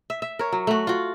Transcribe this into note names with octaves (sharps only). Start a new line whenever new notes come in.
E5
E5
A#4 C#5
F#3
A3 F#4
F4 F#4